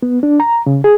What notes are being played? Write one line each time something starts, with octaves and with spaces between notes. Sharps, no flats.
B3
D4
A#5
C#3
G#4